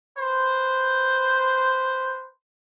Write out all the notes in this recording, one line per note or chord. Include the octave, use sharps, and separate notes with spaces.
B4 C5